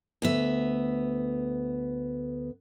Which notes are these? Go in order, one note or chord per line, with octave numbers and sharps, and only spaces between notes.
D2 B3 E5